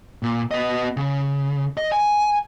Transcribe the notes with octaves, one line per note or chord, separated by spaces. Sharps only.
A#2
B3 D#5
C#3
D#5
G#5